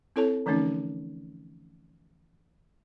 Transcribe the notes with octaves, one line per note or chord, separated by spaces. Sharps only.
C4 E4 A4 C#5 A5
D3 E3 F3 A3 C#4 D#4